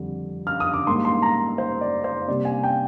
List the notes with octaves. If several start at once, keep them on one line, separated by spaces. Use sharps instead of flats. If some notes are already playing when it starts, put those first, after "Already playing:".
Already playing: F2 D3 G3
F6
D#6
D6
G#2 D#3 G3 A#3 C6
C6
A#5
C5
D5
C5
C3 G3 A#3 D5
G#5
G5